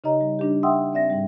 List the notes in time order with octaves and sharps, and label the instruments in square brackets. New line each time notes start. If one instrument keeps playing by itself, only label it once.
[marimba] C#3 D#4 G4 C#5 D#5 A#5
G3
G3 D4 G4
E5 F#5 G5 C6 D#6 E6
C4 D5 E5 A#6
G#2 G3